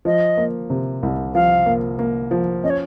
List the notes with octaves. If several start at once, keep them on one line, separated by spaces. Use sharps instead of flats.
F3 D#5
A#3
C3
C2
F3 F5
A#3
A#3
F3
C#4 D#5
C#5